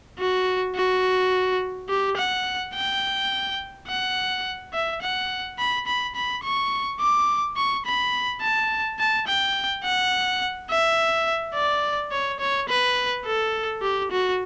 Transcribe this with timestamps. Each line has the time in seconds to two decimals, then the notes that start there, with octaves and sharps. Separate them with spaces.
0.19 F#4
0.75 F#4
1.89 G4
2.17 F#5
2.74 G5
3.87 F#5
4.73 E5
5.02 F#5
5.59 B5
5.87 B5
6.15 B5
6.43 C#6
7.00 D6
7.57 C#6
7.86 B5
8.42 A5
8.99 A5
9.27 G5
9.84 F#5
10.70 E5
11.55 D5
12.11 C#5
12.40 C#5
12.69 B4
13.25 A4
13.82 G4
14.11 F#4